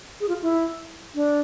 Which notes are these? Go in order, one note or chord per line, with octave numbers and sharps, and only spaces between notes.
G#4
F4
E4
D4